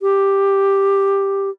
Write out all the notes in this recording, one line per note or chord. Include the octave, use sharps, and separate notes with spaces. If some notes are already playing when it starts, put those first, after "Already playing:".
G4